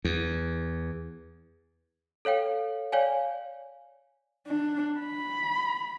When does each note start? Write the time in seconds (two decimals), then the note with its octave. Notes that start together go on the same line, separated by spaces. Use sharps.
0.05 E2
2.25 A4 C#5 F5 G5
2.92 C#5 D5 F5 G5 G#5
4.47 D4
5.00 B5